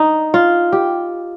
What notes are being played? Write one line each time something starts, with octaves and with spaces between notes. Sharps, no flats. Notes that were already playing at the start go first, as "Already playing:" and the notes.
Already playing: D#4
F4
G4